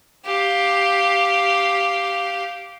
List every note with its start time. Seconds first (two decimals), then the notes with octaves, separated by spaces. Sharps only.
0.26 G4 F5